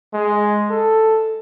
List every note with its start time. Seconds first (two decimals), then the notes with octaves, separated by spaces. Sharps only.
0.13 G#3
0.70 A4